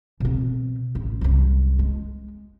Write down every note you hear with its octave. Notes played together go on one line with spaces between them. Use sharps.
B2 C4
A1
C2 F#2
G#3